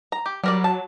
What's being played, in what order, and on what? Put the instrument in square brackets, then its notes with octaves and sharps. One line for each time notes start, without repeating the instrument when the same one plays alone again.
[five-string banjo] A#5
G4
[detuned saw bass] F#3 [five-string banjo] G3 A#4 D5
[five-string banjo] A5